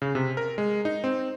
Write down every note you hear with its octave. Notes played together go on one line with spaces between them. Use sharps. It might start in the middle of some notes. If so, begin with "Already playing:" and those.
C#3
C3
A#4
G#3
D#4
C4